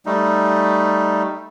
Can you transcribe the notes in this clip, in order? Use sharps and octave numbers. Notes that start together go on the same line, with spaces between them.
G3 A3 D#4